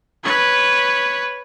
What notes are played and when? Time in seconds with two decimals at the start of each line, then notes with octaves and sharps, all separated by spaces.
0.24 B4 C#5